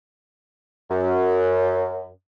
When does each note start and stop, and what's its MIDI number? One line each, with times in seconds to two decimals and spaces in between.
0.90 2.09 42